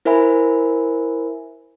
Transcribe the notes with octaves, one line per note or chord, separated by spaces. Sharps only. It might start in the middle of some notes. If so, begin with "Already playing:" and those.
E4 A#4 C5 E5 G#5 B5